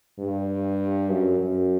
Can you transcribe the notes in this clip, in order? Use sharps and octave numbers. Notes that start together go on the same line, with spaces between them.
G2
F#2
F#2